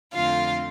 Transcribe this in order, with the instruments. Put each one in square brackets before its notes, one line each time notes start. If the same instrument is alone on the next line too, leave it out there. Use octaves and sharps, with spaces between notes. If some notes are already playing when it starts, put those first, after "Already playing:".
[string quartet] F2 D3 A3 C4 F4 F5